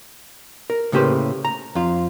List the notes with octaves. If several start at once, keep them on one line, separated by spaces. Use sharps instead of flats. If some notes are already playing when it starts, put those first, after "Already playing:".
A#4
A2 C#3 A#3 G4 B4 C5
A#5
F2 F4